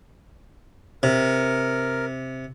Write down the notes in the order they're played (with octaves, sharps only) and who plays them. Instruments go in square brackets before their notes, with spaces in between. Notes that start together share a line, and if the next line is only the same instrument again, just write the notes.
[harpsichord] C3 [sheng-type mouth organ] A#4